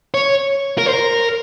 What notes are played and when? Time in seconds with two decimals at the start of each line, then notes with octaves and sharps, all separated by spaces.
0.14 C#5
0.78 A#4
0.86 C5
0.93 A#4